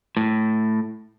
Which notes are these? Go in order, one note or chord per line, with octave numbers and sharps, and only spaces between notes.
A2